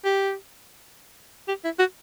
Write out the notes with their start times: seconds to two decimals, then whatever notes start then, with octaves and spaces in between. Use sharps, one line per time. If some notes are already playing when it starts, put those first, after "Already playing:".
0.05 G4
1.48 G4
1.64 E4
1.79 F#4